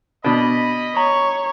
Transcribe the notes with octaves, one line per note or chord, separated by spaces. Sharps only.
B2 D4 D#5 B5
C#5 A#5